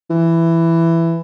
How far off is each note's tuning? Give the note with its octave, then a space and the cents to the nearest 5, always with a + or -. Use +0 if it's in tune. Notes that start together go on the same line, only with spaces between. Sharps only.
E3 +10